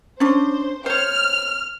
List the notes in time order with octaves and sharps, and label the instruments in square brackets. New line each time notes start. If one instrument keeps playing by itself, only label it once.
[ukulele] C#4 D4 [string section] C5
[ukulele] C5 C#5 [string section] F6